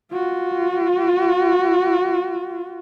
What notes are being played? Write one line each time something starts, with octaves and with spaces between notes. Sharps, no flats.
F4 F#4